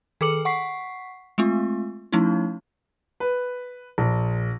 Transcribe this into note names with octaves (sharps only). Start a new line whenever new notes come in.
D#3 G#4 A4 D6 C#7 F#7
F#5 C#6 B6 C7
G#3 A3 C4 F4
F3 A3 C#4 D#4 E4
B4
A#1